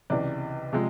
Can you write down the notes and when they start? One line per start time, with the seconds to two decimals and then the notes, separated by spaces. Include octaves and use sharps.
0.10 C#2 C3 E3 D5
0.73 C3 F3 G#3